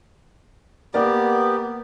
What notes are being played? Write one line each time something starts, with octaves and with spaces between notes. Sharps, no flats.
A#3 B3 G4 A#4 D5